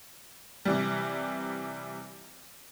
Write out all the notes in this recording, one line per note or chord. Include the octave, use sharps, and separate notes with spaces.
C3 E3 G3